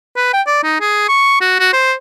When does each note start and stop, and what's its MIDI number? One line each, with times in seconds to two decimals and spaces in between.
0.16 0.31 71
0.33 0.42 79
0.47 0.60 74
0.63 0.78 63
0.80 1.06 68
1.08 1.37 85
1.41 1.55 66
1.59 1.68 66
1.73 1.93 72